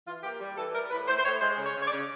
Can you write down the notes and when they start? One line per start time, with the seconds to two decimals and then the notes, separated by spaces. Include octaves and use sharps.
0.07 E3 F4
0.23 A#3 G4
0.40 G3
0.57 E3 A4
0.74 G3 A#4
0.91 A2 B4
1.08 A2 C5
1.18 C5
1.25 A2 C#5
1.41 G#3 C5
1.58 C#3
1.64 C#5
1.75 C#3
1.82 C#5
1.87 D5
1.92 C#3